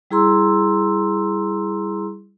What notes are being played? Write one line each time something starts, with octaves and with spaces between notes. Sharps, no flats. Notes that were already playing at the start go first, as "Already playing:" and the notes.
G3 E4 G#4 A#5 C6 E6